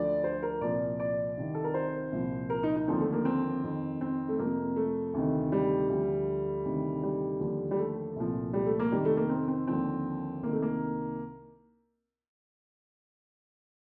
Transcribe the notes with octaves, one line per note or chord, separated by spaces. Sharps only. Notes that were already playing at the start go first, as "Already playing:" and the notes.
Already playing: D2 D3 F3 D5
C5
A#4
C2 A#2 F3 D5
D5
C2 C3 D#3
A4
A#4
C5
C2 A#2 F3
A#4
D#4
D#4
D#2 D3 F3 C4
A3
A#3
C4
F2 D#3
C4
A3
F2 C3 F3 A#3
A3
D2 C3 D#3
G3
D2 D3 F3
D2 C3 D#3
G3
D#2 D3 F3
G3
A3
C2 A#2 F3
G3
A3
A#3
F2 C3 D#3 G3
A3
A#3
C4
C4
D#2 D3 F3 C4
C2 C3 D#3 A#3
A3
A#3